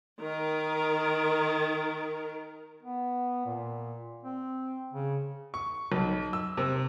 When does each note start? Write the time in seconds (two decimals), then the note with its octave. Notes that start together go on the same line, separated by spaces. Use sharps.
0.20 D#3 A#4
2.83 B3
3.46 A#2
4.23 C4
4.93 C#3
5.54 C#6
5.92 B1
6.33 E6
6.57 C3